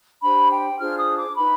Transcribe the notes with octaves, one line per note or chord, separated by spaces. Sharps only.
D4 G4 C5 B5
G5
D4 F4 G#4 C5 F6
D#6
D6
D#4 B4 B5